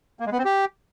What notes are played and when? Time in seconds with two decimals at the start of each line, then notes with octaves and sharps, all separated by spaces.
0.20 A#3
0.26 G#3
0.32 B3
0.39 C4
0.45 G4